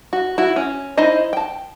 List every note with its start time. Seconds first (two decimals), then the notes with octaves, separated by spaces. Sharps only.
0.13 F#4
0.38 E4 F#4
0.56 C#4
0.97 D#4 E4 C5 D#5
1.33 G5 A5